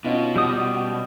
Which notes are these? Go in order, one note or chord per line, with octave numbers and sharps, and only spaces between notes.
B2 C#4 D#4 F4
G3 G4 D#6